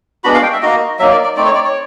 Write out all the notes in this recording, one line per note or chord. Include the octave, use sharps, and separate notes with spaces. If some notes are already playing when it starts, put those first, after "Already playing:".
G#3 B3 D4 F#4 B5
F5
G5
E5
A#3 D#4 F#4 D#5
F#3 A#3 D#4 E5
D5
D5
A3 C4 D#4 D5
C#5
D5
C#5